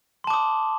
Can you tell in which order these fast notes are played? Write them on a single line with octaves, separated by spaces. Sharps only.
C6 A5 D6 D#6